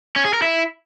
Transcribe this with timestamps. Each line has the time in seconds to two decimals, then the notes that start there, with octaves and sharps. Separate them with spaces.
0.16 C#4
0.25 G#4
0.33 A#4
0.42 E4